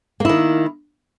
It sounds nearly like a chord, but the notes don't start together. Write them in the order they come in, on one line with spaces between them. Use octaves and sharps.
A#3 E4 D#3